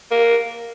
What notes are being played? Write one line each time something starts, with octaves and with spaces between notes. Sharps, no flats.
A#3